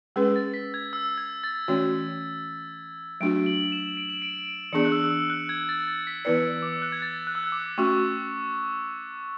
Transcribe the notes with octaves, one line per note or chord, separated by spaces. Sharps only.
G#3 C#4 G#4 B4 E6
A6
B6
G#6
E6
G#6
A6
E3 A3 C#4 F#4 C#5
F#3 A3 D4 F#4 D7
F#7
E7
D7
E7
D7
E3 B3 D4 G#4 D5 C#7
F#6
E6
E6
F#6
G#6
A6
A6
B6
E3 B3 E4 B4 D5 C#7
D6
E6
F#6
G#6
A6
F#6
E6
F#6
D6
A3 C#4 F#4 C#6